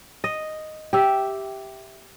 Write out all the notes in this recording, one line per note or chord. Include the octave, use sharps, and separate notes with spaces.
D#5
G4 E5